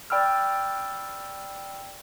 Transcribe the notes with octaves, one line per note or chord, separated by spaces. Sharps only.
D5 G5 B5 E6 F6